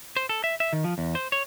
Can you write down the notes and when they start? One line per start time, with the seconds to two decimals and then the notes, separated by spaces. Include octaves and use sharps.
0.17 C5
0.29 A4
0.44 E5
0.60 E5
0.73 D#3
0.84 F3
0.98 E2
1.15 C5
1.32 C#5